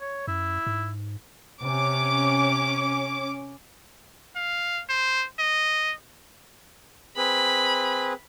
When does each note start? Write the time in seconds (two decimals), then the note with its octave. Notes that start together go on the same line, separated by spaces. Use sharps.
0.01 C#5
0.28 F#2 E4
0.67 G#2
1.62 C3 C#4 D6
4.36 F5
4.89 C5
5.39 D#5
7.17 C4 G#4 B4 B5